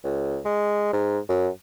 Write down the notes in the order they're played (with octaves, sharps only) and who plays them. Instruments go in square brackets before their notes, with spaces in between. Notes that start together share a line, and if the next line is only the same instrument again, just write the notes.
[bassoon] C#2
G#3
G#2
F#2